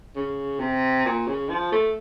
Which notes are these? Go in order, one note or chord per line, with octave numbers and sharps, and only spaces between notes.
C#3
C3
A#2
C#3
F3
A3